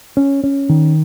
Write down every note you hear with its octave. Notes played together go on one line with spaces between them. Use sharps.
C#4
C#4
D#3